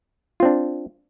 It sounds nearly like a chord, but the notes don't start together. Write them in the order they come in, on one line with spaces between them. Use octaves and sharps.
F4 C4 D4